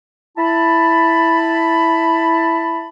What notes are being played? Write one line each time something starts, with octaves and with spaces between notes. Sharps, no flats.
E4 A5 B5